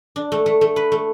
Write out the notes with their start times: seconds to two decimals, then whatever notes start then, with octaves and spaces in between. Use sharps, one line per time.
0.16 D4
0.32 A3
0.46 A3
0.61 A3
0.76 B4
0.92 A3